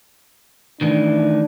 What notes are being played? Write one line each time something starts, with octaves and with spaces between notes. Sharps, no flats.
D#3 E3 A3 D4